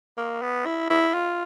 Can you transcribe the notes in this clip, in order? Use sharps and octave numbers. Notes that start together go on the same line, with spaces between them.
A#3
B3
E4
E4
F4